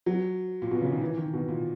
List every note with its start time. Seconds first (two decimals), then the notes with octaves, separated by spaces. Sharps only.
0.06 F#3
0.62 A#2
0.71 B2
0.81 C#3
0.92 D#3
1.02 E3
1.17 D#3
1.33 B2
1.48 A#2